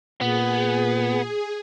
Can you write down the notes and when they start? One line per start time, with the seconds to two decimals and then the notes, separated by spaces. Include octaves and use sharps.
0.21 A#2 B3 G#4